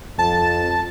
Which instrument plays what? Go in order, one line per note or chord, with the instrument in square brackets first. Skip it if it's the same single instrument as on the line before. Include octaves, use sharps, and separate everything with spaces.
[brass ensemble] F2 [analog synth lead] A5